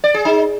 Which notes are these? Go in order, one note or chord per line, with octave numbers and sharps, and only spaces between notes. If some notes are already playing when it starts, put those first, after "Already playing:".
D5
G#4
D#4